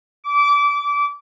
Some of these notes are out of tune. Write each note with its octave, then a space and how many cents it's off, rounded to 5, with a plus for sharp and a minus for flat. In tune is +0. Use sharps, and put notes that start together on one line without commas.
D6 -25